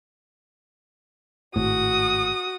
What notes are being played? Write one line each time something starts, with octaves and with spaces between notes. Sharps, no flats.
G#1 A2 F#4 D#6